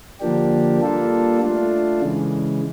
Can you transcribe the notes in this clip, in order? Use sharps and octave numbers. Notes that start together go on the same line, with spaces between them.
D3 F3 A#3 D4 G4
G3 A#3 D4 F4 A4
A3 D4 F4
C#3 E3 G#3